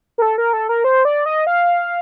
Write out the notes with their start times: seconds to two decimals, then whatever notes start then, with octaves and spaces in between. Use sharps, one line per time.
0.18 A#4
0.22 A4
0.38 A#4
0.53 A4
0.69 A#4
0.84 C5
1.05 D5
1.26 D#5
1.47 F5